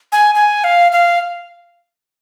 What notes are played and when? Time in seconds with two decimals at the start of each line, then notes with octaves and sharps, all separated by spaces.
0.12 G#5
0.35 G#5
0.64 F5
0.92 F5